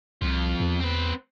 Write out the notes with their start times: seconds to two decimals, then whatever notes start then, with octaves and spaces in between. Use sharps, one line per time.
0.22 C2 F2 F4
0.60 E2
0.80 C4 B4